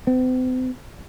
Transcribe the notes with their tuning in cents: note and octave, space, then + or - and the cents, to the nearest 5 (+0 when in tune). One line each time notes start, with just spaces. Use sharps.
C4 -45